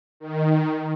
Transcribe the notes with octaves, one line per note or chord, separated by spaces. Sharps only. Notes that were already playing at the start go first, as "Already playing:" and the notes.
D#3